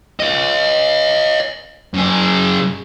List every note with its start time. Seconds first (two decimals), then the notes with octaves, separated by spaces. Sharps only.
0.20 C#5 D#5
1.94 F#2 G#4